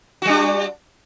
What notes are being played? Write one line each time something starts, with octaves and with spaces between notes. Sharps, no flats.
G3 D4 F#4